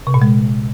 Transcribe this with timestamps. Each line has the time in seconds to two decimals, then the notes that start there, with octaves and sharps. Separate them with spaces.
0.07 C3
0.14 A#2
0.22 G#3